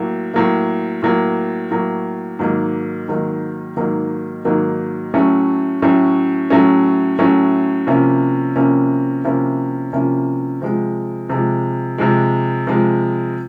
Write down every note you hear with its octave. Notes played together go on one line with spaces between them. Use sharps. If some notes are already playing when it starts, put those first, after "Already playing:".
Already playing: A2 F#3 A#3
A2 F#3 A#3
A2 F#3 A#3
A2 F#3 A#3
G#2 D#3 F#3 A#3
G#2 D#3 F#3 A#3
G#2 D#3 F#3 A#3
G#2 D#3 F#3 A#3
A2 F#3 A3 C#4
A2 F#3 A3 C#4
A2 F#3 A3 C#4
A2 F#3 A3 C#4
C3 F3 A#3 C#4 E4
C3 F3 A#3 C#4 E4
C3 F3 A#3 C#4 E4
C3 F3 A#3 C#4 E4
C3 F3 G#3
C3 F3 G#3
C3 F3 G#3
C3 F3 G#3